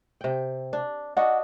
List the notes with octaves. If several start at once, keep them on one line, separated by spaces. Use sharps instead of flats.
C3 G5
D4
D4 D#4 F#4 F#5